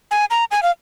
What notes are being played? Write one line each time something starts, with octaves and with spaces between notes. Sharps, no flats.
G#5
A#5
G#5
F5